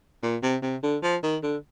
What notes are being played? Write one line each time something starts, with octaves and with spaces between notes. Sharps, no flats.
A#2
C3
C3
D3
F3
D#3
D3